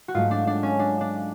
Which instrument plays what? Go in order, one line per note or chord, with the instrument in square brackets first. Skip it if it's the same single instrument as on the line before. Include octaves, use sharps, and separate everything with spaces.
[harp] F#4
G#2 F#3 A3 F4
D4
D4
C#4
D4
D4